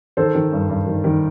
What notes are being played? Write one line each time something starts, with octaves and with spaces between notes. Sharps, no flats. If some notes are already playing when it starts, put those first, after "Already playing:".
D#3 A4 C5
D#3
G2
G2
D#3
D#3